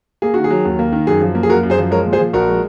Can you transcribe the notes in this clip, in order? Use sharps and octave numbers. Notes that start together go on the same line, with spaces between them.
A#3 G#4
D#3 F#4
G#4
F#3
D#2
A#3
D#3
F#2 G#4
F3
A#3
G#4
F#2 F#4 A#4
F#2
G#4 C5
F3
G#3 A#4 C#5
A#2
G#4 C5
F3
A#1 F#4 A#4
G#3